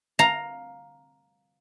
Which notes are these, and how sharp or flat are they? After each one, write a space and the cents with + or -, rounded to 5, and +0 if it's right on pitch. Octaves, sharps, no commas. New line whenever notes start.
F5 +15 A#5 +0